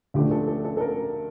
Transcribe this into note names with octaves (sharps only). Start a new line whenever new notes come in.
D2 D3 F3 A3 G4
A4
A4
A4
A4
A#4